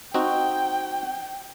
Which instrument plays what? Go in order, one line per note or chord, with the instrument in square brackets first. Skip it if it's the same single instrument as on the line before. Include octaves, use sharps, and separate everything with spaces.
[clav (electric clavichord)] C4 D#4 F#4 [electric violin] G5